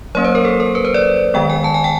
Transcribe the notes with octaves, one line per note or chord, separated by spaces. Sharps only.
F#3 A#3 C#4 C#5
C5
A#4
A4
A#4
B4
C5
D5
D#3 G#3 B3 G5
G#5
A5
G#5
G5